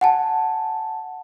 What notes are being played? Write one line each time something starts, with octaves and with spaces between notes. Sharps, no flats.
F#5 G#5 A5